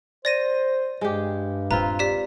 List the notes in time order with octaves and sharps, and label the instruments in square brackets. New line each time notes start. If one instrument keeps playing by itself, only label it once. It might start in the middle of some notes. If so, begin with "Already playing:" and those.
[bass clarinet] C5 [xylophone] D5 A#6 D#7
[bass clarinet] G2 [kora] G#3 G4
[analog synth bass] D#1 [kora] C4 F4 B4 [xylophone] A#5
[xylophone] G4 D5 B6